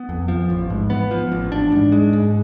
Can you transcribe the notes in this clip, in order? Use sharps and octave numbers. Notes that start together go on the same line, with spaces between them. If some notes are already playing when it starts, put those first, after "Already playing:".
Already playing: B3
F2
F3
A1
G#2
B3
F3
A1
D4
G#2
G#3
G#2